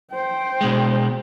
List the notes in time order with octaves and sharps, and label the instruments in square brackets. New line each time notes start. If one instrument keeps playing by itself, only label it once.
[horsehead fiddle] C5 G5
[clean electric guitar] B2 G#3